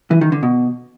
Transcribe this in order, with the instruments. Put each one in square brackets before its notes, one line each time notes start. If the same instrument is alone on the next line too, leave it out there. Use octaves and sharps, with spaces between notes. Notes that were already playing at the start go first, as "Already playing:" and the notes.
[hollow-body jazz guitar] E3
D#3
D3
B2